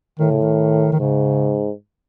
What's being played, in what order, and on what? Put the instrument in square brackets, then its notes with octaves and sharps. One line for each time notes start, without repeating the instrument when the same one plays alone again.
[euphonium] A2 [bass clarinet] D#3
[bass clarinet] C#3
D#3
D#3
[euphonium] G#2 [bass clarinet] C#3